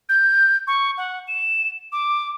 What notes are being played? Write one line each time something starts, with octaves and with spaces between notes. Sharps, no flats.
G6
C#6
F#5
E7
D6